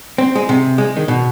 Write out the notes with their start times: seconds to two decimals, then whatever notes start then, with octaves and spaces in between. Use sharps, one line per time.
0.18 C4
0.35 G#3
0.49 C3
0.78 G#3
0.97 D#3
1.08 B2